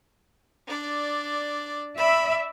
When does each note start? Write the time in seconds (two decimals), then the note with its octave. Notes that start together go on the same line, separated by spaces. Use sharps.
0.68 D4 D5
1.97 D5 E5 B5